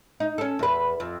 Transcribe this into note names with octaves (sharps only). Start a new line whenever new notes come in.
D#4
C#4 A4
E2 B4
F2